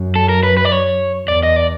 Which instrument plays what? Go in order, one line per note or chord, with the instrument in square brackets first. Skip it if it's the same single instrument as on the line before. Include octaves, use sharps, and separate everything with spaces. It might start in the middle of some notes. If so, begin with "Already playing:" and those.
Already playing: [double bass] F#2
[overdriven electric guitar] A4
A#4
B4
B4
D5
C#5
[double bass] E2 [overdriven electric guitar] D5
[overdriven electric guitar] D#5
D5